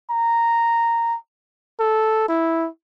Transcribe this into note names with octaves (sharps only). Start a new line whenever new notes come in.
A#5
A4
E4